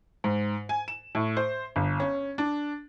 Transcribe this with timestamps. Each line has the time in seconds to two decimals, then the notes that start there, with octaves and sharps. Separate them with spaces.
0.24 G#2
0.69 G#5
0.88 E7
1.15 A2
1.37 C5
1.76 G1
2.00 C#4
2.38 D4